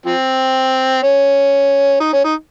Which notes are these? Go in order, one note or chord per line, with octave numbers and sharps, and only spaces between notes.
F3 C4
C#4
D#4
C#4
D#4